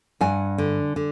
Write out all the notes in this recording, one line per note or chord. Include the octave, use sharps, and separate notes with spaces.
G2 F#5 G#5
D3
D3